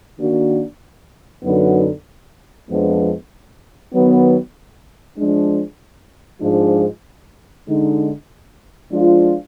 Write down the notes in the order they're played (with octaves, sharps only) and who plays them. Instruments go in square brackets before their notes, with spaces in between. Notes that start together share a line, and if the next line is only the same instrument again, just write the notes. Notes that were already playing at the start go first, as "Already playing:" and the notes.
[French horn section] D#3 A#3 D4 F#4
F#2 D3 F#3 B3 D#4
F2 F3 G#3 B3 D4
D#3 F#3 B3
F3 G#3 D4
G#2 F3 G#3 D4 F4
D3 G#3 D#4
F3 G#3 D4 F4